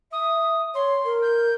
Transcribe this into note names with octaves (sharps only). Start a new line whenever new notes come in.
E5 D#6
C#5 C6
A#4
G6